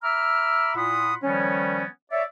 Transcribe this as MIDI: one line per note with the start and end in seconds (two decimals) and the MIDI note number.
0.03 0.75 76
0.03 0.75 82
0.03 0.75 83
0.03 0.75 86
0.03 0.75 88
0.03 0.75 89
0.76 1.14 46
0.76 1.14 64
0.76 1.14 65
0.76 1.14 78
0.76 1.14 83
0.76 1.14 87
1.23 1.85 51
1.23 1.85 53
1.23 1.85 55
1.23 1.85 59
1.23 1.85 61
2.11 2.23 73
2.11 2.23 74
2.11 2.23 76